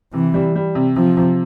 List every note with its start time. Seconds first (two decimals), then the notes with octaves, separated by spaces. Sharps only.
0.13 C3 E3
0.34 G3
0.56 G3
0.75 C3
0.96 C3 F3
1.17 C3